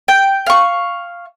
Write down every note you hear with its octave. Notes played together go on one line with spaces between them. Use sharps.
G5
F5 C#6